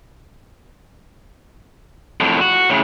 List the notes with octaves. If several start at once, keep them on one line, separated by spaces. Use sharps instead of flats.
F2 A2
F#4
A2 C#3